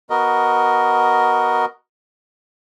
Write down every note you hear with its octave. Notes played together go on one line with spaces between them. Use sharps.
B3 F#4 A#4 D#5